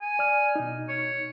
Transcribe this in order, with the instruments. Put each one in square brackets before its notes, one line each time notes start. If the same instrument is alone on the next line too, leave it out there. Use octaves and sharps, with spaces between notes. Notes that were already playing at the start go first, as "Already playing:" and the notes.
[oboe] G#5
[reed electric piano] D5 F6
B2 D#4
[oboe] C#5